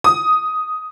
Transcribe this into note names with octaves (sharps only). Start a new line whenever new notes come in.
D#6